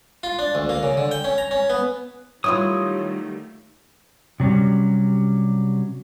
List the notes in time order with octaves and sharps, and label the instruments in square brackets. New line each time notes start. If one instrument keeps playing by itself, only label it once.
[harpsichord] F4
D4
D2
A#3
C#3
D3
G5
C#4
A#5
C#4
B3
[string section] D#3 G3 A3 [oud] F#3 E4 F4 [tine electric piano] C#5 [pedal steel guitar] D#6
[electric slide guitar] C3 F#3 G3 C#4